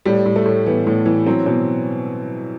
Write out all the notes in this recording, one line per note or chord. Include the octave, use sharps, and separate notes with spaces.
A2 G3
A2
A3
A2
E3 B3
A2
E3
F#3 C4
B2 C4